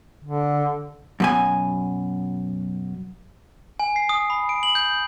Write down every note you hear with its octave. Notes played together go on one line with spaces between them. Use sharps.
D3
F#2 B2 G#5
G#5
C7
D#6
B5
D7
F#7
G6